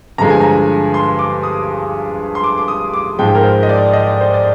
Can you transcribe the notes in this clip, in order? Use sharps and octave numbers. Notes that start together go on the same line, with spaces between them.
G2 D3 F3 G#3 A#5
G#5
A#5
C6
D6
D#6
C6
D6
D6
D#6
D6
G#2 F3 G#3 G5
A#4
C5
D#5
D5
D#5
D5
C5
D5